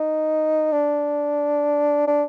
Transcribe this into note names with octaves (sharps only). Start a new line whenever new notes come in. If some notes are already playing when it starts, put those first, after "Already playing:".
Already playing: D#4
D4
D4